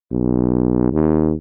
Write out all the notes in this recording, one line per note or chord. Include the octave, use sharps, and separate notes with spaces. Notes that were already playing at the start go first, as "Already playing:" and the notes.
B1
D#2